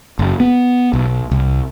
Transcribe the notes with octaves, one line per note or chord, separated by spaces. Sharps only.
F#1
B3
B1
C2